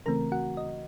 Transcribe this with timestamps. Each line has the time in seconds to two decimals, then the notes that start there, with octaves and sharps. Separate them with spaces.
0.06 C#3 E3 A3 C4 A#4 A#5
0.32 F#4 F#5
0.57 D#5